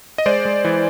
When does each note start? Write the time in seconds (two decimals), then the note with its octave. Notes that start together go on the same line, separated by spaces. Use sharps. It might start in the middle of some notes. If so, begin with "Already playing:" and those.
0.18 D#5
0.26 G#3 C5 D5
0.45 G#3
0.65 E3